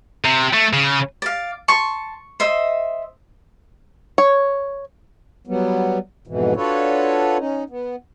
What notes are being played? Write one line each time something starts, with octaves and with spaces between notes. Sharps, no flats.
C3
A3
C#3
D5 F5
A5 C6 C#6
C5 D#5 E5
C#5
F#3 G3 B3
F2 G#2 B2 E3
D4 F4 F#4 A4 B4 C#5
C#4 D#4
B3